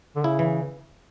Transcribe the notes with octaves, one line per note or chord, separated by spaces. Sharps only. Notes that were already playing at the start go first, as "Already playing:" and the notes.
D3
C#3 E4
E3